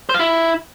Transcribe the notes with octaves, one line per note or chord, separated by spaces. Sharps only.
C5
F5
E4